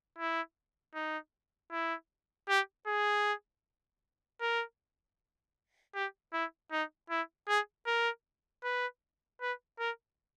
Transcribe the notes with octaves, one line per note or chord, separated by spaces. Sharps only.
E4
D#4
E4
G4
G#4
A#4
G4
E4
D#4
E4
G#4
A#4
B4
B4
A#4